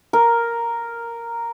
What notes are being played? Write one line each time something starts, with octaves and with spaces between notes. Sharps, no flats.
A#4